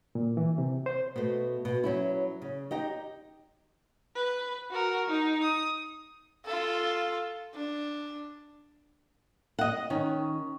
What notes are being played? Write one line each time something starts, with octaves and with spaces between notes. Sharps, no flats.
A#2
E3
C3
C5
B2 A3
B2
F#3 C#4 E4
C#3
D#4 G4 D#5
B4
F#4 A#4
D#4
D#6
F4 A4
D4
D#5 F#5
D#3 C#4